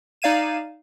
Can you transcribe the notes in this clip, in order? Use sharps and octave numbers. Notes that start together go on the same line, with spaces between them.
D#4 D5 F5 G#6 D#7 E7